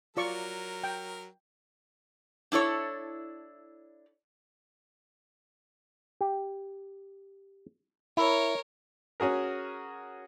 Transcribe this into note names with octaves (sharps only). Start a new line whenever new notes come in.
F#3 F4 A#4 D5 C#6
G5
D4 E4 A4 C#5
G4
E4 A#4 C#5
C#4 F#4 G#4 A#4